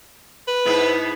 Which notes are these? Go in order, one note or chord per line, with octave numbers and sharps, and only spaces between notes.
B4
G#2 B3 E4